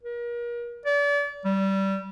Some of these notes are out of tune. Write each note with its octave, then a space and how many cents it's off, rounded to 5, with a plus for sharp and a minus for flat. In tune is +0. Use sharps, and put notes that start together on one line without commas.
A#4 +35
D5 -35
G3 -15